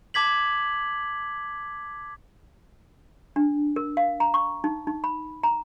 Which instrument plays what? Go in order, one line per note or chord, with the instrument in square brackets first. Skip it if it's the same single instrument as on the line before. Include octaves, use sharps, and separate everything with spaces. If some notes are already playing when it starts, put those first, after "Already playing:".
[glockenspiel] A5 D6 G#6 B6 F#7
[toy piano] D4
A#4
F5
A#5
C#6
D#4
D#4
B5
A#5